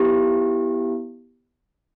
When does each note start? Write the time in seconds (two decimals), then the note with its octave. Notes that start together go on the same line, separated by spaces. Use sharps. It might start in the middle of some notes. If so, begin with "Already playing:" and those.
Already playing: B3 E4 G4